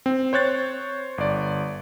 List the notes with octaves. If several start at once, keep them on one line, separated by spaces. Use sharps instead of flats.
C4
C5 C#5 F#6 A6
G1 D5